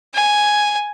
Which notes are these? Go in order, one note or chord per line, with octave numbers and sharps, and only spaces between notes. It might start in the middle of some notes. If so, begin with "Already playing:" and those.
G#5